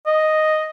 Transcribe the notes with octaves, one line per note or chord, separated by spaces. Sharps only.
D#5